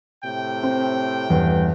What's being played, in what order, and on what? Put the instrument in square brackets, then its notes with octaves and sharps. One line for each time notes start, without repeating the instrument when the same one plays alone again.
[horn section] A2 C3 G5
[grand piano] C4
E2 G2